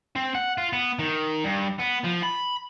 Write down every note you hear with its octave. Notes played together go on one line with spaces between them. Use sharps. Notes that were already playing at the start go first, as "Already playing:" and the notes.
C4
F#5
F4
B3
D#3
G2
B3
F3
B5